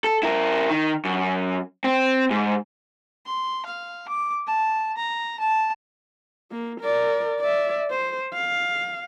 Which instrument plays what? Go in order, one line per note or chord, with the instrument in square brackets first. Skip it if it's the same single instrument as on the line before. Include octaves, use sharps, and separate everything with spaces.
[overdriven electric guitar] A4
E4 A#4
D#3
F#2
C4
G#2
[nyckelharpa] C6
F5
D6
A5
A#5
A5
[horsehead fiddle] A#3
A#4 D5
D5 E5
C5
F5